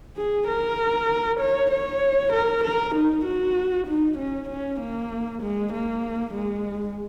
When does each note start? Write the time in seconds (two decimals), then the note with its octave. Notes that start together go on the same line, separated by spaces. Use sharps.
0.17 G#4
0.48 A#4
1.40 C#5
1.71 C#5
2.33 A#4
2.64 A#4
2.95 D#4
3.25 F#4
3.87 D#4
4.18 C#4
4.49 C#4
4.80 A#3
5.42 G#3
5.73 A#3
6.34 G#3